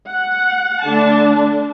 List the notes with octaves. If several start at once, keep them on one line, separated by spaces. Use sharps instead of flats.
F#5
D3 A3 D4 A5